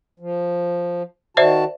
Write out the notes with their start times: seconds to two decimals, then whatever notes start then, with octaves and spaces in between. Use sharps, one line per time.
0.20 F3
1.37 D#3 F#4 C5 D5 E5 A5